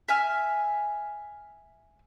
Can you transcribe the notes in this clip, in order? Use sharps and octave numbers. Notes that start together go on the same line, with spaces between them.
E5 G#5 F6